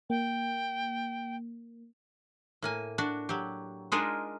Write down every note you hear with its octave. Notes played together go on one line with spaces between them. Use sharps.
A#3 G5
A2 A#3 G#5
D4 F#4
F#3 G4
G#3 D4 D#4 F4 G#4 A#4